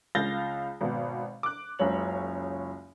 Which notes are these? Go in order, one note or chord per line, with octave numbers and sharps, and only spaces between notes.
C#2 F5 G6 A6 A#6 G7
G#1 B2
D6 F#6
F#1 C#2 C#5 F#7